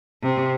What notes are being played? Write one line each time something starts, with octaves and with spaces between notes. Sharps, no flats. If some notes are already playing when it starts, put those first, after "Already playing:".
C3